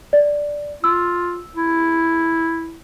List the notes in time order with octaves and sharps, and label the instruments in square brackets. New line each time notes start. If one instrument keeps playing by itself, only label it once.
[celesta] D5
[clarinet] F4 [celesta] E6
[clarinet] E4